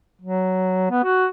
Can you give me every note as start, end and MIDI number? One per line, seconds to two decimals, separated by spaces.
0.21 0.85 54
0.91 1.02 59
1.04 1.26 66